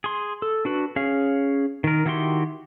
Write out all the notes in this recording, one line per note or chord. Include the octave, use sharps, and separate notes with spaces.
G#4 C6
A4
D4 F#4 B4
C#4 G#4 F5
D#3 A#4
D#3 E4 F#4 G4 C6